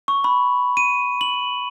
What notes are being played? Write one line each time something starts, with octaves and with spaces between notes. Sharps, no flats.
C#6
B5
D#7
F#7